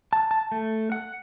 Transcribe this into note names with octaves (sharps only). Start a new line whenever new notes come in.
A5
A5
A3
F#5